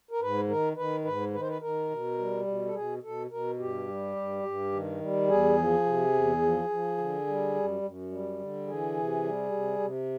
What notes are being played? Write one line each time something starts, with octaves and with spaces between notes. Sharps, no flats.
A#4
G#2 B4
D#3 A#4
D#3 B4
G#2 B4
D#3 B4
C5
B4
D#3 A#4
B2
G3
B2
A4
B2 G#4
B2 A4
B2 A#4
G2 G4
G3
G2
G2
D#3
G3
E2 G#4
F3
C3
E2
F3
F3
D3
G3
F#2
F#2
G3
D3
E3 G#4
C3
G3
C3
C3